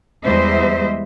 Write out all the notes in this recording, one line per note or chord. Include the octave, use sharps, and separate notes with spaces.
E2 G3 G#3 C5 D#5 E5